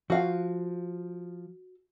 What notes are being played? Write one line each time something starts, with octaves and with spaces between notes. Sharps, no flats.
F3 F#4 F5